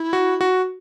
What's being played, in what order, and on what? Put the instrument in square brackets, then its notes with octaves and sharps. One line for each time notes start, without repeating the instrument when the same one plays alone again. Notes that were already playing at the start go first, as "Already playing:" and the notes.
Already playing: [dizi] E4
[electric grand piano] F#4
F#4